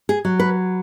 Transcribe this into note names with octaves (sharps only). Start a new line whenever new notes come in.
G#4
F#3
B4